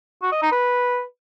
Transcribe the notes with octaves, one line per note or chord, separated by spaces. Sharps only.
F#4
D#5
D#4
B4